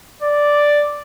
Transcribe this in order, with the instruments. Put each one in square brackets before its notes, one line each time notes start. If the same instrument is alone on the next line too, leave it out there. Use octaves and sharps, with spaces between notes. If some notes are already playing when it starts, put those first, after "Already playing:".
[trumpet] D5